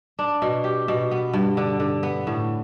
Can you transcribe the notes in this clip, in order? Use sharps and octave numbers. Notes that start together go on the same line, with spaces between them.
D4
B2
G4
B2
B3
G2
D3
D3
B3
A2